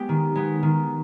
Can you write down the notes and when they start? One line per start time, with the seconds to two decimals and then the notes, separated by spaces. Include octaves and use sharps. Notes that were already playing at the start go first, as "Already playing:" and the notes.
Already playing: G#3 B3 G4
0.09 D#3
0.35 G#3 B3
0.63 D#3